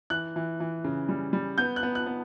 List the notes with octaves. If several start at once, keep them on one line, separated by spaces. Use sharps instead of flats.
E3 F#6
E3
E3
C#3
G3
G3
B3 G6
F#6
B3
F#6
B3